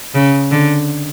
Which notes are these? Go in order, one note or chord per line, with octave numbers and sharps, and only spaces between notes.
C#3
D3